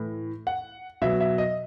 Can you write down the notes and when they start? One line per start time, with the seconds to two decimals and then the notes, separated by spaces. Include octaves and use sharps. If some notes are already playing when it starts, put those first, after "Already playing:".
Already playing: A2 E3
0.47 F#5
1.02 B2 F#3 E5
1.20 E5
1.38 D#5